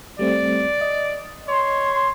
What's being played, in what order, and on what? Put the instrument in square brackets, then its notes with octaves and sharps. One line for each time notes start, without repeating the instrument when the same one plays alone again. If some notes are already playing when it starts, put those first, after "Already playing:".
[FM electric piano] G3 A3 C4 [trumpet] D5
[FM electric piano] D#5
[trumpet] C#5 [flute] C6